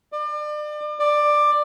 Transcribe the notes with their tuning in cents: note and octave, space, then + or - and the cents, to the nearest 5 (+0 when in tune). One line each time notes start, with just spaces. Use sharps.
D5 +35
D5 +15